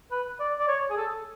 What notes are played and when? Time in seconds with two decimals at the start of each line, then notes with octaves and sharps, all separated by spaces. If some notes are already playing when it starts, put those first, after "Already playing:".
0.11 B4
0.40 D5
0.59 D5
0.68 C#5
0.90 G#4
0.97 A4